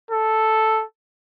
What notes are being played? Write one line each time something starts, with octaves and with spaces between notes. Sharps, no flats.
A4